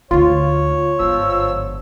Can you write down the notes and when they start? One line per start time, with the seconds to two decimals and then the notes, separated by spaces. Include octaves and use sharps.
0.11 D2 D#4 F4 C#5
1.00 G1 G#2 F3 E6